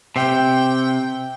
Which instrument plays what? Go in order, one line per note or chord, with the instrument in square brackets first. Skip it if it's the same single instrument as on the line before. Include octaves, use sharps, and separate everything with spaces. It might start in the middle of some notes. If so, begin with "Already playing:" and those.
[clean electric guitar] C3 [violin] G5